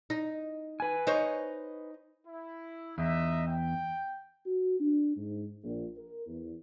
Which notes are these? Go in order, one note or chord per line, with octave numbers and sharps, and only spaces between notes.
D#4
B4 G#5
D#4 C5 C#5
E4
E2 D#4 D#5 E5
G5
F#4
D4
G#2
A#1
A#4
E2